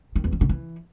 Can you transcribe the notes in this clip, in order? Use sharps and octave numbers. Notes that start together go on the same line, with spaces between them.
D#3
E2
D#3
D3
E3